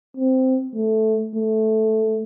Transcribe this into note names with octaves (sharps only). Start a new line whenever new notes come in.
C4
A3
A3